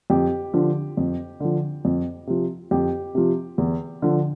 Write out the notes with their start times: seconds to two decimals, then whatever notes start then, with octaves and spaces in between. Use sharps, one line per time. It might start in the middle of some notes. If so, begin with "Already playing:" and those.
0.10 F2 G4
0.54 D3 F3
0.97 F2
1.40 D3 F3
1.85 F2
2.27 C3 F3
2.71 F2 G4
3.15 C3 F3
3.58 E2
4.02 D3 F3